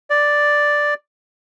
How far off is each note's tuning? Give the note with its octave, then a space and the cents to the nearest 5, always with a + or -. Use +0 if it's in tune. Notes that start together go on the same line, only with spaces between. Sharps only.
D5 +0